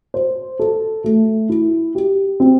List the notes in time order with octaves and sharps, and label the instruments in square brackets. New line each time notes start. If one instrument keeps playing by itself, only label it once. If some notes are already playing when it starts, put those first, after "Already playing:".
[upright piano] C5
A4
A3
E4
G4
C4